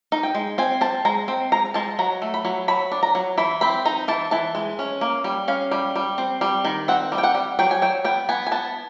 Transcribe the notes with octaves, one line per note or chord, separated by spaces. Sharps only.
D#4
G5
G#3
C4 G#5
C4 A5
G#3 A#5
C4
G#3 A#5
G#3 A5
F#3 A#5
A3
B5
F#3
F#3 B5
D4
A#5
F#3
E3 B5
C4 B5
D#4 A#5
E3 A5
E3 A5
G#3
C#4
A#3
G3
C#4 F5
G3
G3
C4
G3
D#3
C4 F#5
G3
G5
F#5
G3
F#3 G5
G#5
F#3 G5
B3 G5
B3 G#5
G#5
B3 A5